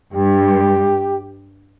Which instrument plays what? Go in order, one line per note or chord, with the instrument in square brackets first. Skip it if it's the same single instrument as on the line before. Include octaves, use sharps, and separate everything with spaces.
[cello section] G2 [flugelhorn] G4